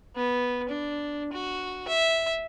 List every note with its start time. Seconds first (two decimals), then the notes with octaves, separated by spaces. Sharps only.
0.16 B3
0.69 D4
1.33 F#4
1.88 E5